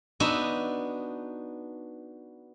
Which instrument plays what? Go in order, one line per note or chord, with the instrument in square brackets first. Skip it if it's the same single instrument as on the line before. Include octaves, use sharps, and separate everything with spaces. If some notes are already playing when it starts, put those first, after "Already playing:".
[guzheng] B3 D4 D#4 F#4 E5